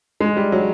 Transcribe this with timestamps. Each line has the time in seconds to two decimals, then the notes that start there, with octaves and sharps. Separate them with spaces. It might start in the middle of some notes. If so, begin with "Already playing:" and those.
0.21 G#3
0.37 G3
0.52 F#3